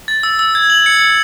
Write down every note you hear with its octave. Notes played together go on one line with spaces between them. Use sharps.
A6
E6
E6
G#6
F#7
C#7
G#6